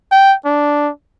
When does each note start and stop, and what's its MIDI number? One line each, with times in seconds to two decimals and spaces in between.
0.11 0.35 79
0.45 0.90 62